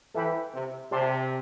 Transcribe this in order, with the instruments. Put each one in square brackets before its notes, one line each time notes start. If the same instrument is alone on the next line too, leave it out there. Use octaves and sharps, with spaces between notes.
[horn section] E3 [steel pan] A4 E5 G5 B5
[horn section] C3
[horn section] C3 [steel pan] G4 D5 A5 C6